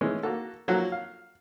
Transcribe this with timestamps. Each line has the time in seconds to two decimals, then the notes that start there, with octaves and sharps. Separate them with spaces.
0.01 E3 G#3 A3 C#4
0.23 A#3 F#4 A4
0.68 F3 F#3 A#3 F#4 A4
0.92 F5